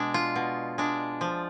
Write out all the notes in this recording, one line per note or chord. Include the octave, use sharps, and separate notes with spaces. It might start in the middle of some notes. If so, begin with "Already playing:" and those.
Already playing: B2 G#3 D4
F4
B2
G#3 D4
F3